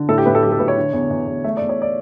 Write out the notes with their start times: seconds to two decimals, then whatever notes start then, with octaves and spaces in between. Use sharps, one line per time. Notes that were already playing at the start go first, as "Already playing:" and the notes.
Already playing: D3
0.09 A2 A4
0.18 G4
0.26 A2 B4
0.35 A4
0.43 F#3 G4
0.52 A4
0.59 A2 B4
0.68 C#5
0.77 D3
0.93 E2
1.11 E2
1.27 E2
1.44 A3 E5
1.57 E2 D5
1.69 C#5
1.82 D5